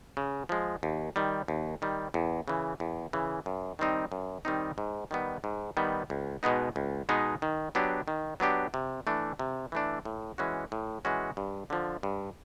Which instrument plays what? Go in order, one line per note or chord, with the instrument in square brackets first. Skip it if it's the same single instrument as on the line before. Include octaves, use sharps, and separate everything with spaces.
[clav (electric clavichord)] C#3
F3 G#3
D#2
D#3 G3
D#2
D#3 G3
E2
C#3 E3
E2
C#3 E3
F#2
D#3 G3 C4 D#4
F#2
D#3 G3 C4 D#4
G#2
D#3 G3 B3
G#2
D#3 G3 B3
C#2
B2 G#3 B3 D#4
C#2
B2 G#3 B3 D#4
D#3
F#3 B3 D4 G4
D#3
F#3 B3 D4 G4
C3
E3 A3 D4
C3
E3 A3 D4
A2
E3 G#3 C#4 F#4
A2
E3 G#3 C#4 F#4
G2
D3 F3
G2